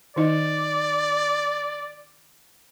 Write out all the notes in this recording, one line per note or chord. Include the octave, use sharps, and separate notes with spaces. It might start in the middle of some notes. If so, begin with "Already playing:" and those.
D#3 D#4 D5 D#5